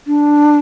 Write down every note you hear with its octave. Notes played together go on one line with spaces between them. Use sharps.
D4